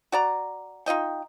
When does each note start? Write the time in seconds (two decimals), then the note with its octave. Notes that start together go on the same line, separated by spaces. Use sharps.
0.12 F#4 D5 A#5
0.86 D#4 F4 D#5 G5